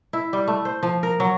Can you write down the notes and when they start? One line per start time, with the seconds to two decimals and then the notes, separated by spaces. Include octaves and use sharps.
0.13 E4
0.33 G3
0.48 A3
0.65 C5
0.83 F3
1.03 A#4
1.20 F#3